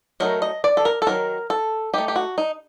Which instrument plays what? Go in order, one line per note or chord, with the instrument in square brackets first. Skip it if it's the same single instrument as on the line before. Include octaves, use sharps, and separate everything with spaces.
[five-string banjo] F#3 A3 D#4 A#4
D#5
D5
A4
A#4
A4
D#3 F#3 A#4
A4
A3 D#4 G4
G4
F#4
D#4